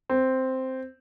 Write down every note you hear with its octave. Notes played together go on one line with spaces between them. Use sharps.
C4